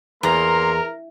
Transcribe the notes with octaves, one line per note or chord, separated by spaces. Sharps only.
E2 A#3 A#4 A#5 C6